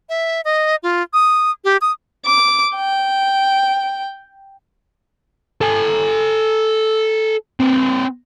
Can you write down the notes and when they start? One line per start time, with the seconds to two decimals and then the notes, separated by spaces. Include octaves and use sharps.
0.09 E5
0.45 D#5
0.83 F4
1.14 D#6
1.65 G4
1.81 D#6
2.26 D6
2.76 G5
5.61 A4 G#5
7.60 C4 B4